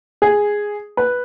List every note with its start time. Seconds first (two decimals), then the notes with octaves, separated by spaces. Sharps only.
0.22 G#4
0.97 B4